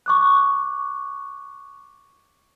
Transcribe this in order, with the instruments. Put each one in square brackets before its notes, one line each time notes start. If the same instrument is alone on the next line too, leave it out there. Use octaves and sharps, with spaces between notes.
[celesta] C#6 D6 F#6